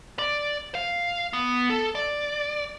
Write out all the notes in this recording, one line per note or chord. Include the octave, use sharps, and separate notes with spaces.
D5
F5
B3
A4
D5